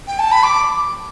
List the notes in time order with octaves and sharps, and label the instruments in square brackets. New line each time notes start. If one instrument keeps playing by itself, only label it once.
[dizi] G5
A5
B5
D6